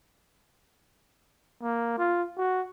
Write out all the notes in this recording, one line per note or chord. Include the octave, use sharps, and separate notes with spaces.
A#3
F4
F#4